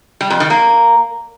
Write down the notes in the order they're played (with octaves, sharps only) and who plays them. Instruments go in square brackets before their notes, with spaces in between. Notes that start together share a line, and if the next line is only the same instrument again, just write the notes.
[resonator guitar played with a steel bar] G3
F2
D#3
A#3